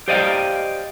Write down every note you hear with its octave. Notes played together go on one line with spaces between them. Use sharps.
G4 C5 D5 D#5 F5 G5